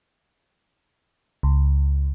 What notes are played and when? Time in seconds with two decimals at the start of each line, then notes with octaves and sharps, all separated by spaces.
1.43 C#2